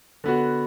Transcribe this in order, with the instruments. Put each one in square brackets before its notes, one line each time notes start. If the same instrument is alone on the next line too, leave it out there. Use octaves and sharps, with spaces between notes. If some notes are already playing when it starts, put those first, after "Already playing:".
[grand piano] D3 B3 F#4